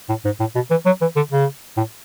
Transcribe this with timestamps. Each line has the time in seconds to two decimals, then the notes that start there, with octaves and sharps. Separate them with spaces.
0.09 A2
0.25 G#2
0.40 A2
0.55 B2
0.70 E3
0.86 F#3
1.01 E3
1.16 D3
1.31 C#3
1.77 A2